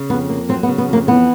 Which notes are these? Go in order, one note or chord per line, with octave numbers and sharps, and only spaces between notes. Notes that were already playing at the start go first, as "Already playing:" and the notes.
Already playing: C#3
F2 B3
A#3
F#3 C4
B3
C#3
B3
F2 A#3
E3 B3